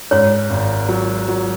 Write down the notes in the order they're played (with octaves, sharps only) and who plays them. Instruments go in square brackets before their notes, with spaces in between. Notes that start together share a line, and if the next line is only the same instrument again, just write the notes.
[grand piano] G#2 [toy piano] C#5
[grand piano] G#1
F#3
F#3